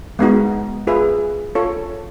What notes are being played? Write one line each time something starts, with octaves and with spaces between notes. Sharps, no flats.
G#3 B3 D#4 F#4
F4 G#4 B4 E5
F4 A4 C#5